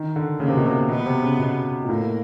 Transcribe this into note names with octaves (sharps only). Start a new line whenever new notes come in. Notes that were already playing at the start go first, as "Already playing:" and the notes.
Already playing: D#3
D3
C#3 A#3
C3
B2
C3
B2 B3
C3
C#3
B2
A#2
A2 A#3